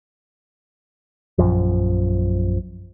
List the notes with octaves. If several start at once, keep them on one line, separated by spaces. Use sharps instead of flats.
A#1 F#2 F3